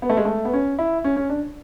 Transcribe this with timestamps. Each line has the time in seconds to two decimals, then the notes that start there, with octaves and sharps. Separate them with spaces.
0.02 B3
0.10 A3
0.17 G#3
0.25 A3
0.45 B3
0.53 C#4
0.79 E4
1.04 C#4
1.16 C#4
1.30 D4